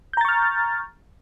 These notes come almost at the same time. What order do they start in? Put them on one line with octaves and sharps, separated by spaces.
G6 A#5 A6 C#6 F6